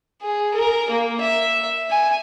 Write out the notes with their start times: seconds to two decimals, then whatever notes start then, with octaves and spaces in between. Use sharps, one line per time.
0.22 G#4
0.54 A#4
0.90 A#3
1.20 E5
1.90 G#5